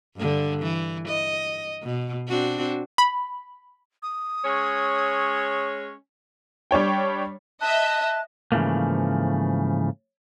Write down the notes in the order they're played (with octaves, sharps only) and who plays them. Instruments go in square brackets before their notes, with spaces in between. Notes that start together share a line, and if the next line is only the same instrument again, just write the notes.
[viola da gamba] G2 D3
E3
D#5
B2
C4 D4 F#4
[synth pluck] B5
[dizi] D#6
[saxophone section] G#3 C#4 C#5
[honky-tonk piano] G3 D4 C#5 G5
[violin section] D#5 E5 [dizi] A5 [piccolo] F#6
[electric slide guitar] G#2 C#3 E3 F3 A3 A#3